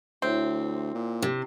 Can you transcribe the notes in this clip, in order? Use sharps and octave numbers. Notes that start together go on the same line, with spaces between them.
D2 C4 E4 C#5 E5
A#2
C3